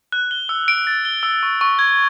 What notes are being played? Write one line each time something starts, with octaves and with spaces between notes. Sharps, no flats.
F#6
G7
E6
D7
A6
G7
E6
C#6
C#6
G#6